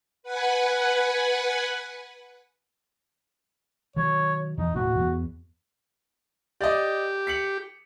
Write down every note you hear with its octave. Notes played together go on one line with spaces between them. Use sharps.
B4 F#5 G#5
D#3 F#3 C#5
E2 D#4
D#1 A2 F#4
E2 B3
G4 D5 D#5
B6 C#7 F#7